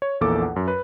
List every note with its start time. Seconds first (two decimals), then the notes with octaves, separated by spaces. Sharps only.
0.02 C#5
0.21 A#1 E2 A#3 A4 D6
0.42 F#5
0.56 F#2
0.68 B4